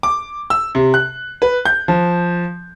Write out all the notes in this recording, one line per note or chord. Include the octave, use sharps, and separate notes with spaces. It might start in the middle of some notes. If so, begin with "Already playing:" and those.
D6
E6
C3
F#6
B4
G6
F3